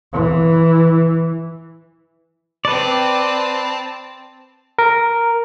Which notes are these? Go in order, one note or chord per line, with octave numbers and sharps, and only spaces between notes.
E3
C4 B4 D5 A5
A#4